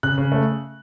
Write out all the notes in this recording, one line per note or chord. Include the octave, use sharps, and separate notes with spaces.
C#3 F#6
C#3
A3